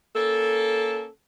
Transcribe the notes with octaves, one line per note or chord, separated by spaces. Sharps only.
A#3 C#4 A4